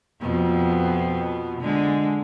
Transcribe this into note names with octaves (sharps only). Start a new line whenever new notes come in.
F2 B2 B3
D3 G#3